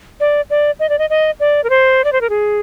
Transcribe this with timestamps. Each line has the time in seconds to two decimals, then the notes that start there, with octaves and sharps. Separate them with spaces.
0.20 D5
0.50 D5
0.79 D#5
0.89 D5
0.99 D#5
1.10 D#5
1.40 D5
1.64 A#4
1.70 C5
2.04 D5
2.12 C5
2.21 A#4
2.29 G#4